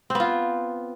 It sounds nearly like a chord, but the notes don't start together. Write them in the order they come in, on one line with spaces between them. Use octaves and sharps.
C4 B3 F4